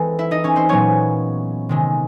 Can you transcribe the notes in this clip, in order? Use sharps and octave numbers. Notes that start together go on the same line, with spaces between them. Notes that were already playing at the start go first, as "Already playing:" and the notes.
Already playing: E3 G#3 C4 A4
E4 E5
D#4 D#5
C#4 C#5
C4 C5
A#2 F#3 B3 C#4 C#5
C3 D#3 G#3